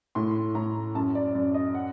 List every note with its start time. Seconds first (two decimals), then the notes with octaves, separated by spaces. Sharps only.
0.15 A2 C6
0.55 A2 A#5
0.95 F#2 A5
1.15 D5
1.35 F#2 D5
1.54 D#5
1.75 F#5